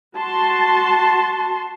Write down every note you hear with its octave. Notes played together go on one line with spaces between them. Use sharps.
F#4 A5 C6